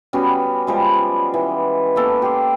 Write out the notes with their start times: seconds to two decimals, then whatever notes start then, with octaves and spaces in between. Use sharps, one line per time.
0.13 G3 B3 C#4 F#4
0.67 F3 G3 G#3
1.34 E3
1.96 A#3 B3 A4
2.22 G4 C6